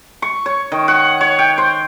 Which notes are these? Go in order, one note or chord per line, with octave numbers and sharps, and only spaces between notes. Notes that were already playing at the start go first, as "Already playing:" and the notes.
C#6
C#5
D#3
F#5
C#5
G5
C5